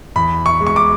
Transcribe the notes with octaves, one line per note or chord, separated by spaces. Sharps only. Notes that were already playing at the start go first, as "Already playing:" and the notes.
E2 B5
C#6
G#3
C#6
D6